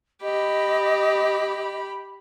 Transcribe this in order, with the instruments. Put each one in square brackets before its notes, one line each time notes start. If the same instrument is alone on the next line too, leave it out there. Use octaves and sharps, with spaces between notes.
[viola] G4 B5 [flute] D#5